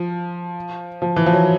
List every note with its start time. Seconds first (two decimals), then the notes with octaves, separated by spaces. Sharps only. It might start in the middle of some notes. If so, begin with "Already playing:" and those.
Already playing: F3
1.02 F3
1.16 E3
1.26 F3
1.33 F#3